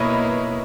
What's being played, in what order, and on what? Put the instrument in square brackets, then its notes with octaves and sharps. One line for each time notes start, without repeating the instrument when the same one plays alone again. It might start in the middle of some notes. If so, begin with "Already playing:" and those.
Already playing: [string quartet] B2 A#3 E4 [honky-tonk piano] B4 C#5 D#5